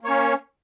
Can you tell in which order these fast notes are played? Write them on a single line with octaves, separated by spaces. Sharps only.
A#3 C#5 C#4